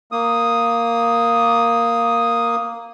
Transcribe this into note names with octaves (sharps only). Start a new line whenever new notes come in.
A#3 D#6